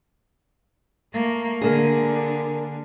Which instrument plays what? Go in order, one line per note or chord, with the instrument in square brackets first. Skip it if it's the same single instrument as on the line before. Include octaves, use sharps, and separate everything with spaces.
[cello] A3 A#3
[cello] D3 [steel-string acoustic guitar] A#3 D4 G#4